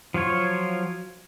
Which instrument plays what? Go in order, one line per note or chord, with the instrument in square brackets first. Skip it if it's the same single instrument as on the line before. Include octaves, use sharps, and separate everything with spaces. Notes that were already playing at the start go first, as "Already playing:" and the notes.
[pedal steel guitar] F3 F#3 F4 C#5